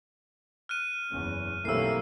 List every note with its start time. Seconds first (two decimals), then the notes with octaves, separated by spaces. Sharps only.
0.69 F6 F#6 D#7
1.11 F#1 E2 C#4
1.65 B1 C3 E3 F#3 A3 A#3 E6 C7